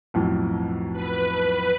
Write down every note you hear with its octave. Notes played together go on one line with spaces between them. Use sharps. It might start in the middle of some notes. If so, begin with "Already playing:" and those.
B1 F2 A2
B4